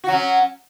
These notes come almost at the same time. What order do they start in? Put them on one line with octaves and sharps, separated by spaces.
F#4 F#3 C#4